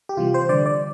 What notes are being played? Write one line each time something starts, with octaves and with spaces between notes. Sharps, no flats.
G4
C3 E3 G3 F4
C5
D3 G3 D5
D5